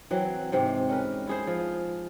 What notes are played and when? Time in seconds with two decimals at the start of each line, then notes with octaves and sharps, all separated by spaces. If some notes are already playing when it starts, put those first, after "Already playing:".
0.11 E3 F#3 C4
0.52 G#2 C3 C4
0.89 C#4 A#4 B4
1.27 E4 G#4 C5
1.47 F3